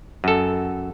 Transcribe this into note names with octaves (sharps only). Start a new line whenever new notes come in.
F#2 A4